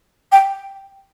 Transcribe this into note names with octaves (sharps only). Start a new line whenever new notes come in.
G5